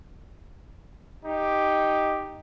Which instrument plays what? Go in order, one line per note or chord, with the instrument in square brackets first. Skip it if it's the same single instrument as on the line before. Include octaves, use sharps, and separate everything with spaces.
[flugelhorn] D#4 [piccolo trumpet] G4